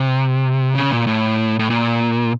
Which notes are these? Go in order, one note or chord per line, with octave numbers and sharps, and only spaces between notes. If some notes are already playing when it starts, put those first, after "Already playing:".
Already playing: C3
C#3
A#2
A2
A2
A#2